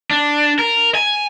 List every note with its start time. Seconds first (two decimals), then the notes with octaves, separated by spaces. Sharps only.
0.11 D4
0.59 A#4
0.95 G#5